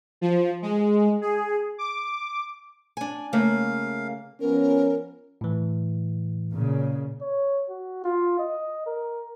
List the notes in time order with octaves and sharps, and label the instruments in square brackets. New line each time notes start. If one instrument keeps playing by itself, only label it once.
[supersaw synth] F3
G#3
G#4
D6
[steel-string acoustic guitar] D4 G#5
[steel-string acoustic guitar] C#3 A3 A#3 [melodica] F5
[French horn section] F3 B3 C#4 [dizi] A#4
[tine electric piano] A2 E3
[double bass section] A#2 C#3
[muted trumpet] C#5
F#4
F4
D#5
A#4